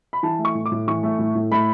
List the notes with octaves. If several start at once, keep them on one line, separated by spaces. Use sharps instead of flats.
B5
E3 A5
A3
C#6
A2
D6
A2
E3 C#6
A3
A2
A2
A3 B5